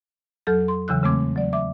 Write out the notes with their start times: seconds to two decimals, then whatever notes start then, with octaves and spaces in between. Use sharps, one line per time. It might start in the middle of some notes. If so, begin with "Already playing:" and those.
0.47 F2 F#3 A4 F6 G6 A6
0.68 C6
0.88 E2 C#3 E3 F#3 E6 F#6
1.03 C#3 G#3 A3 C4 D6 G#6
1.36 F#3 D5
1.53 E5 D6